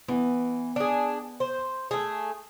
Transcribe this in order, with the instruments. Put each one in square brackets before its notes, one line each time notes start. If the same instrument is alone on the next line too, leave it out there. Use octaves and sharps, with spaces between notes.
[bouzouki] E3 [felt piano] B3
[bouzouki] D4 G#4
C5
A3 G#4